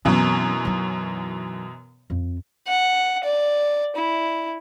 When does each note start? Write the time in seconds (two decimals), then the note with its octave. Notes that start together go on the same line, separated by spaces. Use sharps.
0.05 F#2 B2 E3 F#3 C4
0.65 F#3 D#4
2.10 F2
2.68 F#5
3.24 D5
3.96 E4